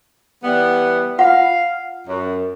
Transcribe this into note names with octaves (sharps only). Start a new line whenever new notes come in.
E3 G3 B3
F4 F5 F#5
F#2